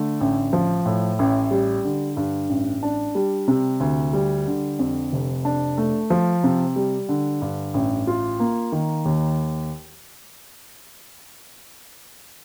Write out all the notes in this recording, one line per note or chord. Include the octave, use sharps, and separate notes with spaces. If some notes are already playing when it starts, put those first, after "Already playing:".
Already playing: D3 A3
A1
F3
A2
A1
G3
D3
G2
A1
D4
G3
C3
D2
G3
D3
F2
F1
D4
A3
F3
C3
G3
D3
G2
A1
F4
A#3
D#3
D#2